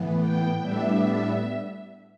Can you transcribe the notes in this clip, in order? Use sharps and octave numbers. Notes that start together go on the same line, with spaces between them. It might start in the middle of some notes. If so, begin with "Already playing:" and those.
Already playing: A2 E3 B3
G5
A2 G3 B3 D4 E5